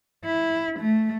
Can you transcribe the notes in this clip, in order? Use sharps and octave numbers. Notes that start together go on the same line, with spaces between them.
E4
A3